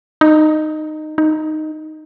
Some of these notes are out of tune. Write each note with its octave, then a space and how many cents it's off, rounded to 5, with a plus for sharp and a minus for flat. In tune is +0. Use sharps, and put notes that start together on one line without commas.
D#4 -15
D#4 -5